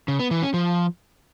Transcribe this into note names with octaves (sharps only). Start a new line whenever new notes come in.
C#3
B3
E3
C#4
F3